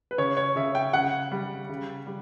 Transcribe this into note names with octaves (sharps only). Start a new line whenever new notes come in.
B4
C#3 C#5
C#5
C#3 E5
G5
C#3 F#5
G3
C#3
G3